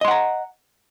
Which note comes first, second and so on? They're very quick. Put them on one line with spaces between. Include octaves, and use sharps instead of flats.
D#5 C6 F#5 A#5